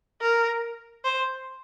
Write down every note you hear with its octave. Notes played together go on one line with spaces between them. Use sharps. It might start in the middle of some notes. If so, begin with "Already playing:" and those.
A#4
C5